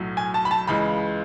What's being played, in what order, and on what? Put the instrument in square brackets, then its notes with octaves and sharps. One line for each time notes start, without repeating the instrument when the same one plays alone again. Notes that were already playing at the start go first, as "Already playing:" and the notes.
Already playing: [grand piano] B1 A2 F#3
G#5
A5
B5
A5
C#2 C#3 E3 G#3 B5